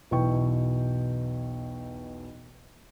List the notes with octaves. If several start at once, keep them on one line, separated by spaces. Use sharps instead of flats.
B1 E2 B2 E4 G5 C#6